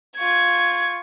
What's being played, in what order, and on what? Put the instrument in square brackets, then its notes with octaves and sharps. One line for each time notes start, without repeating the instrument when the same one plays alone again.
[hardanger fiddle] F4 C#6 [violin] G#6